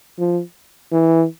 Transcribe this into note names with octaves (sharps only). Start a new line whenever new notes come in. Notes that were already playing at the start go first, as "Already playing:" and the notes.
F3
E3